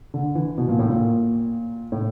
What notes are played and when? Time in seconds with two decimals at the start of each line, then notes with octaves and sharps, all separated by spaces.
0.14 D3
0.35 E3
0.58 B2
0.69 A#2
0.79 A2
0.90 A#2
1.92 A2